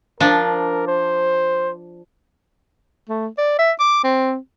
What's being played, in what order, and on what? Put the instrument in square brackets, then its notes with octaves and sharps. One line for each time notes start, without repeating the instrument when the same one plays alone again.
[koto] F3 D4 [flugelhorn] A#4
[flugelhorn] C5
[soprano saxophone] A3
D5
E5
D6
C4